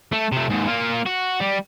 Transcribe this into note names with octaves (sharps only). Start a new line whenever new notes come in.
A3
C3 A3
D#2 G#2
A#3 F4
F#4
G3